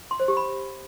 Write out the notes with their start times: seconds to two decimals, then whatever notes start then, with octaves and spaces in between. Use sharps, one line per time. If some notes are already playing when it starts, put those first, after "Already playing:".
0.11 C6
0.20 C5
0.28 G4
0.37 B5